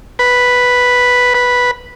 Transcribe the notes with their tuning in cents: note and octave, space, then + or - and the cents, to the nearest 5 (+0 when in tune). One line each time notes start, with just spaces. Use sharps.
B4 +0
B4 -5